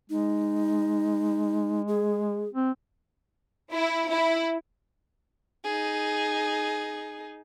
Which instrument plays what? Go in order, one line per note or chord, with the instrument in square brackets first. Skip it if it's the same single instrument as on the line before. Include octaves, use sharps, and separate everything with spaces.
[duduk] G#3 [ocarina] D#4
[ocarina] G#4
[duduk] C4
[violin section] E4
E4
[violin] D#4 G#4